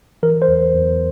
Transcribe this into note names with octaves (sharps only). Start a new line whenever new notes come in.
E3 A#4
C5
E2
E2